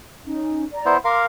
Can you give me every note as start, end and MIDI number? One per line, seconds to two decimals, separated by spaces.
0.25 0.62 61
0.25 0.62 63
0.73 0.95 74
0.73 0.95 82
0.86 0.97 59
0.86 0.97 64
0.86 0.97 72
1.05 1.26 70
1.05 1.26 77
1.05 1.23 84
1.05 1.23 86